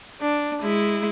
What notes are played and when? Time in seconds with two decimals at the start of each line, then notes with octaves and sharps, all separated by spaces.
0.21 D4
0.63 G#3 E4